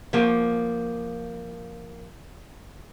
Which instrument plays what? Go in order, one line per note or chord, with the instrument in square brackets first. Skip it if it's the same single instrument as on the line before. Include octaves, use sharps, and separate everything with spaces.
[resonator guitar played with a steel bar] F3 A#3